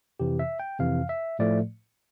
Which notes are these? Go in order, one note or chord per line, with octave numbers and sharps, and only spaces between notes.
F2 C3 E3 G4
E5
G5
F2 C3 E3 F5
E5
A2 F3 A3 D5